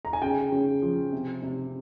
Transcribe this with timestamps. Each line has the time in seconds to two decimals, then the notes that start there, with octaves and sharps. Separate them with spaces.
0.05 A#5
0.13 G#5
0.22 C#3 G5
0.52 C#3
0.82 F3
1.13 C3
1.43 C3